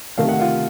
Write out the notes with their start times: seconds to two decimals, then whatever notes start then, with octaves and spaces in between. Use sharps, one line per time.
0.18 C3 D#3 A3 F5
0.29 F#5
0.39 F4 F5